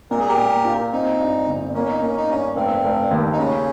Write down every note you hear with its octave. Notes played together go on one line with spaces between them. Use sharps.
A#2 A#4
G#4
G4 A#4
A#2
F4
C4 D#4
G2
G1
A#3 C#4
D#4
A#3 C#4
D#4
G2 C#4
F1 C4
F1
D#2
D#4
C#3 C#4